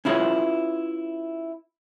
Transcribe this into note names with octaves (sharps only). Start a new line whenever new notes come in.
C#4 E4 F4 G#4 B4 C#5